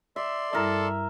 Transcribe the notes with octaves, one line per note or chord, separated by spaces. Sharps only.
D5 E5 C6
G2 G3 E4 A4 A#4 E5